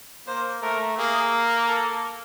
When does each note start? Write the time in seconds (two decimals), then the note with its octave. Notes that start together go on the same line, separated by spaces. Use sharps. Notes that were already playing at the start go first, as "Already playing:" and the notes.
0.27 A#3 C5
0.62 A3 A#4
0.98 A#3 G#4
1.68 A4